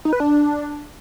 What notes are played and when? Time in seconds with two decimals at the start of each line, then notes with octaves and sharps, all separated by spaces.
0.05 D#4
0.13 B4
0.20 D4